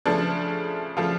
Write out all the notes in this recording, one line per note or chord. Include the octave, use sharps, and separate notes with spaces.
C#3 F3 A3 D4
C#3 F3 A3 F4